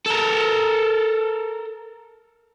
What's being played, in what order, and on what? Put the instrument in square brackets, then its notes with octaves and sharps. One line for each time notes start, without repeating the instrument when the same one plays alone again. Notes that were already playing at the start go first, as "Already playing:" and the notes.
[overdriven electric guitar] A4 A#4